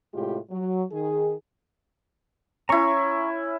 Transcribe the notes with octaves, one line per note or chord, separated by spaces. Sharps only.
A2 C3 G#3 F4 G4
F#3
D#3 G#4
C#4 E4 A#5 C#6